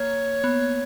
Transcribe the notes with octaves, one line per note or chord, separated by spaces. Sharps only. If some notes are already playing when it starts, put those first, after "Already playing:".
Already playing: A#3 C#5
B3